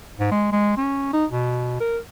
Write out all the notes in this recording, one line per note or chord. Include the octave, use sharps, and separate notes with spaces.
G#2
G#3
G#3
C#4
D#4
B2
A#4